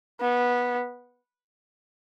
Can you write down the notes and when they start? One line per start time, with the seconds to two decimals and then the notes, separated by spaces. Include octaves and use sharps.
0.20 B3